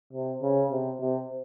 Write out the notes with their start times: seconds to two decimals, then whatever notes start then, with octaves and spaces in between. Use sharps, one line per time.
0.13 C3
0.43 C#3
0.71 C3
1.00 C3